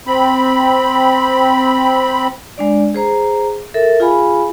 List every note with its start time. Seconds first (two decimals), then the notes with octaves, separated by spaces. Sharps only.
0.07 C4 B5
2.58 G#3 D4 D5
2.94 G#4 C5 A#5
3.74 A4 A#4 E5
4.00 F4 G#4 F5 G#5 B5